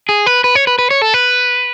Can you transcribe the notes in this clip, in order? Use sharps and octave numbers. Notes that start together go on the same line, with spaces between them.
G#4
B4
B4
C#5
B4
B4
C#5
A4
B4